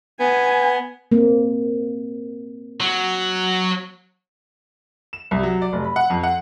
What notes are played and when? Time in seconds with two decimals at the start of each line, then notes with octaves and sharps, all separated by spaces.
0.20 B3 G#5
1.12 A#3 C4
2.80 F#3
5.13 E7
5.31 C2
5.43 F#3
5.62 D5
5.73 F1
5.84 B5
5.96 F#5
6.10 F2
6.23 F#5